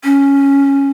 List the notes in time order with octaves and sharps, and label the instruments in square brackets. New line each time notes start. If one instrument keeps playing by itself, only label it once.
[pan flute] C#4